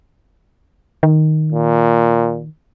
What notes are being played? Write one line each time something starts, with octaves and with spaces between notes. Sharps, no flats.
D#3
A#2